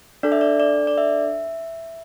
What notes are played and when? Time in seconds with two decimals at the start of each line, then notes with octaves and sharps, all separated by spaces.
0.23 D4 A4 D5
0.32 E5
0.41 D5
0.60 D5
0.87 D5
0.98 E5